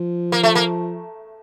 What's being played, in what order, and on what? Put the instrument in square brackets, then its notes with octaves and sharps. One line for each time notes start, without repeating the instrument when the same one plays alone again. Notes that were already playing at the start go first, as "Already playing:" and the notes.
Already playing: [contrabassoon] F3
[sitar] A#3
A3
A#3